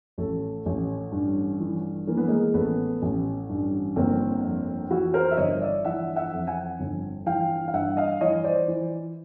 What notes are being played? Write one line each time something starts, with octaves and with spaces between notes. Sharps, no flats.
A1 A3
A1
G2
E3
E3 A#3
B3
G#3 A#3
A1 A3 B3
A1
G2
G1 A#3 C4
F2
E3 E4 F#4
A#4 C5
E5
G1 C#5 D#5
D5 E5
E3 E5 F#5
E5 F#5
F2
F#5 G#5
G1
E3 F5 G5
F5
G2 E5 F#5
D#5 F5
E3 C#5 D#5
C5 D5
E3